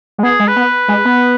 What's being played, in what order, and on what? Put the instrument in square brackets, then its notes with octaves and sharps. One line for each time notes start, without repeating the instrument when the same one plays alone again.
[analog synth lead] G#3
[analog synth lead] B3 [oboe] G#4
[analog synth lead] G#3
[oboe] B4
[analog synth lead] B3
G#3
B3